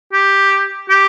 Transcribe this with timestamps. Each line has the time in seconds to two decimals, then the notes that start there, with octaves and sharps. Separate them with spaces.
0.13 G4
0.89 G4